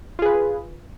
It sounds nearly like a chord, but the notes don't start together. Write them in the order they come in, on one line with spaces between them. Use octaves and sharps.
F4 G#4 B4